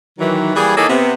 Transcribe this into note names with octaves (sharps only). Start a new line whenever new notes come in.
D#3 E3 F#3
E3 G3 A#3 G#4
E3 A#3 D#4 G#4 A4 C#5
C3 B3